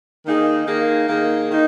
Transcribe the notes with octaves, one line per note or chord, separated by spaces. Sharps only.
D#3 A#3 D#4 G#4
D#3 A#3 D#4 G#4
D#3 A#3 D#4 G#4
D#3 A#3 D#4